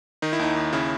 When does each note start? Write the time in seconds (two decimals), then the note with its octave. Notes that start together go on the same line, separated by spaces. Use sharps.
0.22 D#3 D#4
0.33 E4
0.39 D#2 D#4
0.56 D#2
0.72 C#3 E4